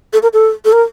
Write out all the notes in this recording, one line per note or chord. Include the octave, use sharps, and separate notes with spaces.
A4
A#4
A4
A4
A#4